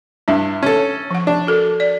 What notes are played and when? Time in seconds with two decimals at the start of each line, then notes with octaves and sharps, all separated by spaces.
0.28 G2 D4 E4
0.63 C#4 A4
1.11 F3 F#5
1.27 D4
1.47 F#4 A4 A#4
1.80 D5